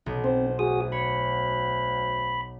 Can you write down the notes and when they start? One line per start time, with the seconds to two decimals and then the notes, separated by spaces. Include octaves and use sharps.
0.06 B1
0.24 C4 C5
0.59 D2 F#4 G#4 D#6
0.92 C#5 B5